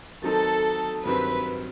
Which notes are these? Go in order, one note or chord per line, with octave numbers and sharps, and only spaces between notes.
D#3 F#3 C4 D#4 A4
G2 D#3 F#3 C4 B4